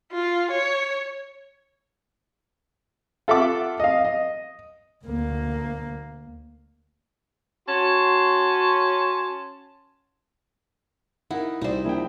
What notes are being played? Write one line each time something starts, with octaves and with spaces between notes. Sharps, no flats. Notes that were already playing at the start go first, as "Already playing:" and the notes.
F4
C#5
F4 A4 E5 F#5 D6
D#5 F5
D#5
D2 A#3
C#4 F#4 C#5 A5 C6
D#4 E4 A#4 F#5
C2 D#4 C5 D5
A#1 E4 G5